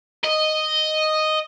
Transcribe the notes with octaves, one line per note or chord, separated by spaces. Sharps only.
D#5